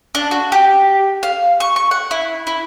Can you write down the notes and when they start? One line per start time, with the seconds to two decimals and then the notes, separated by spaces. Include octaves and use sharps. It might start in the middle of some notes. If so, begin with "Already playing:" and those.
0.15 D4
0.31 F#4
0.52 G4
1.23 F5
1.60 C#6
1.76 C#6
1.91 F#5
2.11 E4
2.47 E4